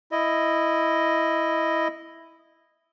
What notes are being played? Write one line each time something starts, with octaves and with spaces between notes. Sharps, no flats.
E4 D#5